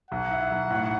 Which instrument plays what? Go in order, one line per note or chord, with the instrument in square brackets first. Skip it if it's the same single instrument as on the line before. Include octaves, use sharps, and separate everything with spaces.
[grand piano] B1 [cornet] F#5
[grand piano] E4
B1
A2